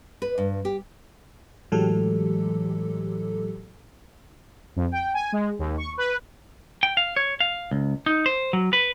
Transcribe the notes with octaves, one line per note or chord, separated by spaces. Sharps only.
B4
G2
G4
A2 E3 F#3 G#3 G4 A4
F2
G5
G#5
G#3
D#2
C#6
B4
G5
F5
C#5
F5
C#2
D#4
C5
F#3
B4